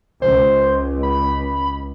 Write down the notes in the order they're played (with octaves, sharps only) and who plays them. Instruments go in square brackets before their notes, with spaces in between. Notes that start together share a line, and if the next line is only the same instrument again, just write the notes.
[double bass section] C#2 [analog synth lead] C5
[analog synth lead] B5